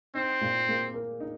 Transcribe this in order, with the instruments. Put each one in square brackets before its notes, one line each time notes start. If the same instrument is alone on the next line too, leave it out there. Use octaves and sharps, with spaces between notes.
[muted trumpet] C4 [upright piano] D#4
[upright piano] A#2
A#3
A#4
D#4